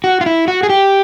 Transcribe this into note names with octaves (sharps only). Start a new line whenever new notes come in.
F#4
F4
E4
F#4
G#4
G4